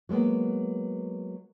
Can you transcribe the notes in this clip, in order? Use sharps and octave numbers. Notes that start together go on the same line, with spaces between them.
F#3 G#3 A#3 B3